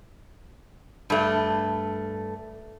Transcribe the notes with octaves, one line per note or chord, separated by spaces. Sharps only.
G2 A3